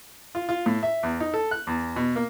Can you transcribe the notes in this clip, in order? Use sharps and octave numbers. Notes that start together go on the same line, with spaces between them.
F4
F4
A2
E5
E2
D#4
A4
F#6
E2
B2
A#3